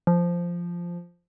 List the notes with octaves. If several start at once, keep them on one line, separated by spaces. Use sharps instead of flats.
F3